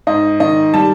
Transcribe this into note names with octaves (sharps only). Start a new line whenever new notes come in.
G#2 D#5
D#3 D#5
G3 A5